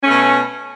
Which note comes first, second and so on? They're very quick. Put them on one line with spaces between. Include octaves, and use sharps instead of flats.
C#4 A3 B2